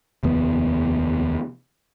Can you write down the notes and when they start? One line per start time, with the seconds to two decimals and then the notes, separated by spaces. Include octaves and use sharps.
0.23 F1 D#2 B3